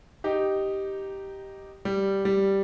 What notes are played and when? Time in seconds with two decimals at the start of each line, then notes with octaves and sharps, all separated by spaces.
0.24 D#4 G4
1.85 G3
2.25 G3